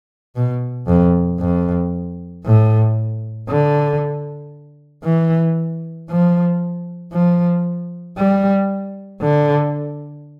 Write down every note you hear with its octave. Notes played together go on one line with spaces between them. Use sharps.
B2
F2
F2
A2
D3
E3
F3
F3
G3
D3